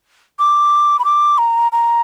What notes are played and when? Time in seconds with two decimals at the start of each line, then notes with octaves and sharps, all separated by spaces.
0.39 D6
0.99 B5
1.04 D6
1.38 A#5
1.72 A#5